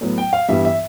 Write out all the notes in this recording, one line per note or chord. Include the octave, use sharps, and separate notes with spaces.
A2 F#3 B3
G5
F5
G2 E3 G3 B3 E5
E5